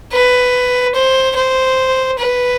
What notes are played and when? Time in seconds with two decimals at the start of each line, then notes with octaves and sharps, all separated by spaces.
0.12 B4
0.95 C5
1.36 C5
2.19 B4